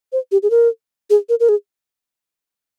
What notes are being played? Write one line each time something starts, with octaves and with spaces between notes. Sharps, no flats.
C5
G4
G#4
A#4
G#4
A#4
A#4
G#4